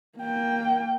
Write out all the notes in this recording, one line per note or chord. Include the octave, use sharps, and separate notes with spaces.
A#3 G5